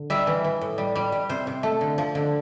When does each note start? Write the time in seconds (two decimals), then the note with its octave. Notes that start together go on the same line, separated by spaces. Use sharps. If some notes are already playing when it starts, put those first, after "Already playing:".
Already playing: D3
0.10 G3 E5
0.27 E3
0.44 E3
0.61 A2
0.78 G3
0.96 G3
1.12 G3
1.29 C3 C5
1.47 C3
1.63 A3
1.81 D3
1.98 F3
2.15 D3